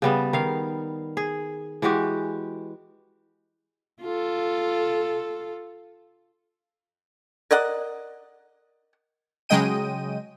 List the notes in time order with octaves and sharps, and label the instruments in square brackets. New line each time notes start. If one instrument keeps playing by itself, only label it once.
[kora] C#3 G3 B3
D#3 F5
G#4
E3 G#3 F#4 G4
[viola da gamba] F4 A4
[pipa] A#4 D5 D#5 F#5
[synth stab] C#3 F#3 G#3 D#5 G5 D#7